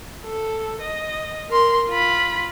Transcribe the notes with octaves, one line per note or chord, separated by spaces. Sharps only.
A4
D#5
A#4 C6
F4 B5